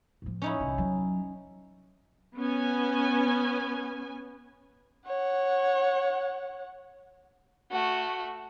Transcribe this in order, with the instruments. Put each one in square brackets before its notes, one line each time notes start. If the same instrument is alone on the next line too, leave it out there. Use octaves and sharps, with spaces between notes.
[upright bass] A2 F3
[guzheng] C#4 D#4 E4
[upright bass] C2 E3
F#3
[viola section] B3 C#4 G#5
[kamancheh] C#5 F#5
[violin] A3 F#4